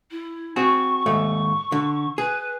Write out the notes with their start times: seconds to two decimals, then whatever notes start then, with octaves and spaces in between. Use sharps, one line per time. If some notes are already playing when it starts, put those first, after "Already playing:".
0.11 E4
0.56 C4 F#4 G#4 C#6
1.06 D#2 G#2 A3 C#6
1.72 D3
2.18 G#4 B4